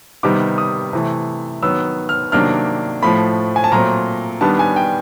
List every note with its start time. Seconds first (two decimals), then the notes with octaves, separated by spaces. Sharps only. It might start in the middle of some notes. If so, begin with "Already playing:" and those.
0.23 C3 D#3 G3 B3 D#4 D6
0.58 D#6
0.93 C3 E3 A3
1.62 D#3 F#3 B3 E6
2.09 F6
2.32 C3 D#3 F#3 A#3 D4 F6
3.02 A2 F3 A3 B5
3.56 G#5
3.64 A5
3.72 A#2 F#3 A3 C4 A#5
4.41 D#3 G3 B3 D4 A5
4.59 G#5
4.76 G5